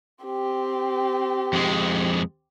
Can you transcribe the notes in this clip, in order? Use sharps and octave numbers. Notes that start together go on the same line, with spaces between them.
C4 G4
F2 G#3